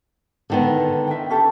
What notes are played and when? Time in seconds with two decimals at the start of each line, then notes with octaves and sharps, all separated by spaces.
0.50 D3 D#3 B3
1.07 E5 G5
1.30 C#4 G4 A4